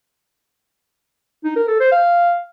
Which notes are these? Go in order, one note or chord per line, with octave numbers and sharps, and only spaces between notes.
D#4
A#4
A4
C5
F5